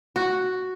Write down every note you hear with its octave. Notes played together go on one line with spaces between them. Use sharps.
F#4